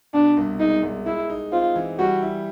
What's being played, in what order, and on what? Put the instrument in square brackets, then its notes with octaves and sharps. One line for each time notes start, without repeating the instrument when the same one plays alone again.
[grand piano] B2 [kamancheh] D4
[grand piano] C2
[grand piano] G#3 [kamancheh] D#4
[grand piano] C2
[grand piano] G#3 [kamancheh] E4
[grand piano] D#4
[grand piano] C4 [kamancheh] F4
[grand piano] E3
[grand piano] G3 [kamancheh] F#4
[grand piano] E4